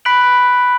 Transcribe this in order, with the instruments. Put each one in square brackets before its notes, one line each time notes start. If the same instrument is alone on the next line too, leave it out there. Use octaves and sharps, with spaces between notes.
[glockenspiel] B5 F#6 B6 D7 F#7